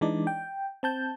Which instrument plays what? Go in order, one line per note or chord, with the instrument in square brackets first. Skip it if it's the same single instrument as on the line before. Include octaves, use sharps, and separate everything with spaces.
[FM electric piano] E3 G#3 D4 D#4 D5
G5
C4 A5 G6